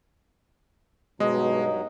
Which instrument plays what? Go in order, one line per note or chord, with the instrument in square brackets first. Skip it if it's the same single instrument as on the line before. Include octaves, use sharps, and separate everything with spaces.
[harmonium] G2 F#3 D#4 [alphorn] B2 [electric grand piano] G#3 [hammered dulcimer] D#5